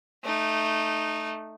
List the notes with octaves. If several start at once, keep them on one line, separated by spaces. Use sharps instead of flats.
A3 D#4